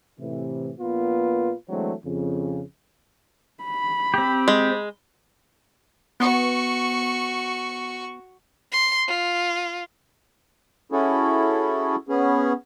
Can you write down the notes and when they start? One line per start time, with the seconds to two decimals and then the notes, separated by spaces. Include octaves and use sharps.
0.19 A2 C3 E3
0.80 A#1 A#2 B3 F4 B4
1.68 E3 F#3 G#3 A3 C4 D4
2.04 F2 C#3
3.64 B5
4.14 C4 G4
4.48 G#3
6.20 B3 F#4 C#6
8.72 C6
9.08 F4
10.92 C#4 E4 F#4 G#4 A4
12.09 B3 C#4 G#4